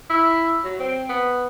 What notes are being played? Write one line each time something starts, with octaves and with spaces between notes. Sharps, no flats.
E4
F#3
C4
B3